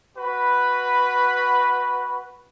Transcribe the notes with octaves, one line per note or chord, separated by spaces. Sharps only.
F#4 B4 B5